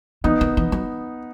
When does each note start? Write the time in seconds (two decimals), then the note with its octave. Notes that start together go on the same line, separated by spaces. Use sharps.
0.24 E3 B3 D#4
0.41 D#3
0.57 E3
0.72 F#3